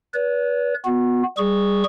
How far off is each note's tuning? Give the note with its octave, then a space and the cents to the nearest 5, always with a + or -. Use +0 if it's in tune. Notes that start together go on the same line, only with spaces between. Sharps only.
B4 -25 D5 -45
B3 +0 F#4 -35
G3 +0 G#4 -10 C#6 +0